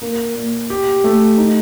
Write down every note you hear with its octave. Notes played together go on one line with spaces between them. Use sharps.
A#3
A#2
G4
A3
D#4